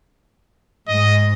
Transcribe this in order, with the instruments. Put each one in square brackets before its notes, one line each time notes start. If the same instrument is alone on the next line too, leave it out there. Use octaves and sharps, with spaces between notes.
[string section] G#2 [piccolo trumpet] D#5